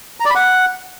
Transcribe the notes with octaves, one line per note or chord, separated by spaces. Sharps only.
A#5
D5
B5
F#5